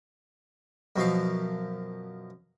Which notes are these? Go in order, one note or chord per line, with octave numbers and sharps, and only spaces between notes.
F#2 B2 F3 F5